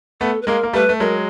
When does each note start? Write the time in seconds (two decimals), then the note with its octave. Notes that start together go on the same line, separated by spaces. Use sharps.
0.21 A3 B3 A4
0.42 B4
0.47 G#3 A#3 A#4
0.63 A#3
0.73 G3 A3 B4
0.89 A3
1.00 F#3 G#3 A#4